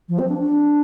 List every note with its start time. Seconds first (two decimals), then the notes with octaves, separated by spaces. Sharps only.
0.09 F3
0.19 C4
0.29 D4
0.39 D4